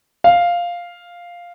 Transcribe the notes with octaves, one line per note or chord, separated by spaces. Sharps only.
F5